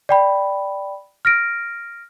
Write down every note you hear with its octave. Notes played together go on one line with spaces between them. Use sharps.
D5 G5 B5
F6 A#6 D7